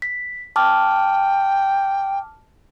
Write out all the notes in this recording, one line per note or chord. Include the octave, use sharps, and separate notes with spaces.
B6
G5 A5 D6 F6